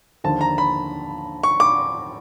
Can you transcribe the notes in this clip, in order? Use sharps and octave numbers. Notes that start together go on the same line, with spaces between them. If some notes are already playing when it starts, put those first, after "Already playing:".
D#2 D3 F3 A5
A#5
B5
C#6
D6